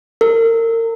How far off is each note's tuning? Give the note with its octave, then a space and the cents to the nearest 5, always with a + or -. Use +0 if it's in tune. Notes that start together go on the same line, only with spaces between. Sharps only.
A#4 -30